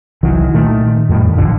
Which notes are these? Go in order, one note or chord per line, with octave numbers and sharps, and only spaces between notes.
C2 D#3 E3 F#3
A#2 D#3 A3
F2 A2 D#3 G3
A#1 F#2 D3 F3